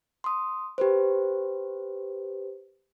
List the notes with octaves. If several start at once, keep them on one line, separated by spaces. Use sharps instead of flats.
C6 D#6
G4 B4 C5